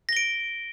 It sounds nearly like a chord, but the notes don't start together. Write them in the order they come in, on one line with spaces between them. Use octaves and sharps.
A#6 G7 D7